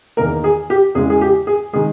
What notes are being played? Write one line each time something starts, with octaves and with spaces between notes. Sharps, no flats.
E2 D#3 A#3 A#4
G#4
G4
E2 C#3 E3 G#3 G#4
G#4
G4
G#4
D#3 G#3 G#4